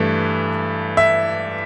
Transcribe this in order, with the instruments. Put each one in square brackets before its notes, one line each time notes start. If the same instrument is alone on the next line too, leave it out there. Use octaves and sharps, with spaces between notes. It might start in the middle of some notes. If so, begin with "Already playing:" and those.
Already playing: [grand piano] G2 E3 A3
E5